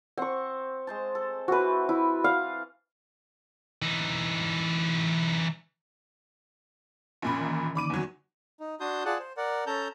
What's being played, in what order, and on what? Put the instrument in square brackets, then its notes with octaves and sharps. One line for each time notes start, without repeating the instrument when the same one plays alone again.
[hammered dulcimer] C4 [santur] F#5 C#6
[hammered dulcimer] G#3 C5 A5
A4
[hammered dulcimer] E3 C4 [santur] F#4 B4
[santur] E4
F5 F#5
[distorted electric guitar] E3 D#4
[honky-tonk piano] A#1 A#2 B5 [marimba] C#4
[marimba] D#3 E3 A#5
[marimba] D3 A#3 D#4 [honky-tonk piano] B5 D6 D#7
[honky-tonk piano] E2 F#3
[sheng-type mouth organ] D#4
D4 F#4 A5 C6 D#6 G6
F4 G#4 D5 F#5 A5 F#6
C5
A#4 D5 F#5
C#4 A4 A5 A#5 G6